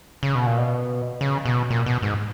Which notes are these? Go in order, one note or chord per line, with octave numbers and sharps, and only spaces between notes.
C#3
B2
A#2
B2
C#3
B2
A#2
B2
G#2